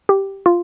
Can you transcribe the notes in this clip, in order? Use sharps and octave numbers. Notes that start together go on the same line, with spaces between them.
G4
F4